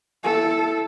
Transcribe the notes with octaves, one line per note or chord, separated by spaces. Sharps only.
E4 A4